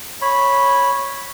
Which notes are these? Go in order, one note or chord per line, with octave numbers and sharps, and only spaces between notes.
C#5 B5